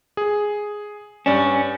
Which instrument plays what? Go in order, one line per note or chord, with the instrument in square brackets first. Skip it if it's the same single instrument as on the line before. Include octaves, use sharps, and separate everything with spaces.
[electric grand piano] G#4
[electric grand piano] G2 D5 E7 [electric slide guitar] C#4